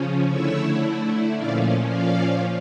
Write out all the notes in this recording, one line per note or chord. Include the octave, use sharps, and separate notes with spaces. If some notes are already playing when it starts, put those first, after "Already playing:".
Already playing: C#3 F3 C#4
D3 A3 E4 C#5 E5
A#2 F3 C#4 D5 F5
D5 F5